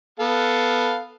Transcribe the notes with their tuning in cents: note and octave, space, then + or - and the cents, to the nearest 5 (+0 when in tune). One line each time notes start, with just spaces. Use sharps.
B3 +0 A4 +0 F5 +0